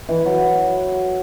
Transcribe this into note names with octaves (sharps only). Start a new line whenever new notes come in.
E3
F#3